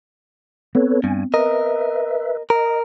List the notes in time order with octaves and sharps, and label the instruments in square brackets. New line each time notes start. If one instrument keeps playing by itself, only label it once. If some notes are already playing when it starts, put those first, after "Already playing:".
[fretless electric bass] B3 C4 [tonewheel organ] A4 B4 C#5
[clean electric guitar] G2 [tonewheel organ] G#5
[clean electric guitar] A#4 D#5 [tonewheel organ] B4 E5
[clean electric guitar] A#4 [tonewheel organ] D#5